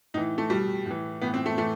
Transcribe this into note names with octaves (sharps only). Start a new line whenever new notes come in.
A2 E3 D#4
A3
B2 G3
A2 E3
A2 E3 B3
C4
A3
A2 E3 A3